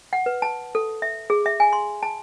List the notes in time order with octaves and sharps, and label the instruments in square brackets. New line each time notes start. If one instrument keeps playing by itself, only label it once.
[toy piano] F#5
B4
A5
A4
E5
G#4
E5
G#5
C6
A5